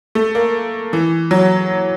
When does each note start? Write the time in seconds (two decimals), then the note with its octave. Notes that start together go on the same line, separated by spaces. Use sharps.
0.15 A3
0.35 A#3
0.93 E3
1.31 F#3